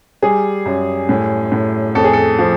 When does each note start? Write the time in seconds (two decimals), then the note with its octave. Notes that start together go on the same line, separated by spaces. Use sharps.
0.22 G3 G#4
0.66 F#2
1.09 A2
1.52 A2
1.95 F2 A4
2.04 G#4
2.13 A4
2.39 F3